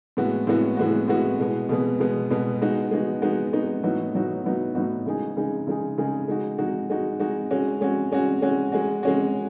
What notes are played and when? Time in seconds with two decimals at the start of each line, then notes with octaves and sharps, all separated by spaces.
0.17 A2 G#3 B3 F#4
0.47 A2 G#3 B3 F#4
0.77 A2 G#3 B3 F#4
1.08 A2 G#3 B3 F#4
1.39 B2 G#3 B3
1.69 B2 G#3 B3
2.00 B2 G#3 B3
2.30 B2 G#3 B3
2.62 G#3 B3 D#4 F#4
2.91 G#3 B3 D#4 F#4
3.22 G#3 B3 D#4 F#4
3.53 G#3 B3 D#4 F#4
3.83 A2 F#3 B3 D#4 F#4
4.15 A2 F#3 B3 D#4 F#4
4.44 A2 F#3 B3 D#4 F#4
4.75 A2 F#3 B3 D#4 F#4
5.06 C#3 G#3 D#4 G#4
5.36 C#3 G#3 D#4 G#4
5.67 C#3 G#3 D#4 G#4
5.98 C#3 G#3 D#4 G#4
6.28 G#3 D#4 F#4
6.58 G#3 D#4 F#4
6.90 G#3 D#4 F#4
7.20 G#3 D#4 F#4
7.51 G#3 C#4 F#4
7.81 G#3 C#4 F#4
8.11 G#3 C#4 F#4
8.42 G#3 C#4 F#4
8.72 G#3 C#4 F#4
9.03 G#3 C#4 F#4